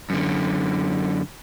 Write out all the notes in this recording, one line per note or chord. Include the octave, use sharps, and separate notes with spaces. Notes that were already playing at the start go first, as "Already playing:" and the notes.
F#2 D3